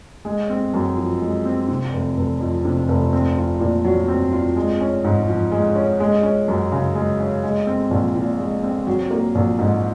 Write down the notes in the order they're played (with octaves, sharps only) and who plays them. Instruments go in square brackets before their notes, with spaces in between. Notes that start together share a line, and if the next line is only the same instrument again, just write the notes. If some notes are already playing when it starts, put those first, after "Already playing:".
[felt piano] G#3
C4
F#2
F3
G#3
C4
C3
F1
F1
F2
C3
F1
C4
F4
A#2
F#3
C4
F4
G#3
C#4
G#2
F3
G#3
C#4
G#3
C#4
F#2
C#3
G#3
C#4
G#3
C4
A#1
A#2
G#3
C4
F#3
A#3
A#1
G#2